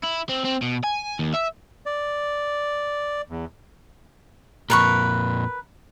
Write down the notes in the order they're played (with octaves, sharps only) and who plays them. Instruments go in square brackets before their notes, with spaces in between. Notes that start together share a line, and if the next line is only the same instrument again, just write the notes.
[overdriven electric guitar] E4
C4
C4
B2
G#5
D#2
E5
[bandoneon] D5
E2
[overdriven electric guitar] F2 A#2 [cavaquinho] A#4 B4 C#6